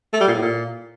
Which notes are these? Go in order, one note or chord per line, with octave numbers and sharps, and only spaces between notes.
A3
G3
A#2
A2
A#2